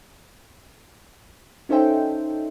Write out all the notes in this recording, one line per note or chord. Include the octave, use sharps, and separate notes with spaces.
C#4 D#4 A4 C5 E5 G5